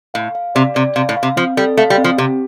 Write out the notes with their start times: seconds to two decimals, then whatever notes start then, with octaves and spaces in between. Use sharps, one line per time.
0.14 A2 F5
0.35 F5
0.55 C3 D5
0.75 C3 D5
0.96 C3 F5
1.09 A2
1.17 F5
1.23 C3
1.36 F3 C4
1.57 G3 A4
1.77 A3 F5
1.90 G3
1.98 C4
2.04 F3
2.18 C3 G4